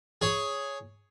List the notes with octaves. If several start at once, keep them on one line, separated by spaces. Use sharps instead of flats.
G#4 C#5